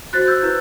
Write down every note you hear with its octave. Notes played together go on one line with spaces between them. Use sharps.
F#4 C5 F#6 A6
E6 G6
E4 B4